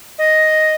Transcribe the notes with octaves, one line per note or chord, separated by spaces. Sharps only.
D#5